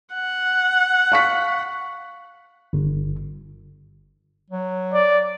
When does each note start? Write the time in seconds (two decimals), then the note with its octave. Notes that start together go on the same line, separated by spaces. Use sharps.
0.14 F#5
1.12 F5 C#6 B6
2.73 G1
4.50 F#3
4.94 D5